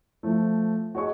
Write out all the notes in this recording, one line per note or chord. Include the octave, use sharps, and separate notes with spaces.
F3 A3
F#4 G#4 C#5 D#5 C#6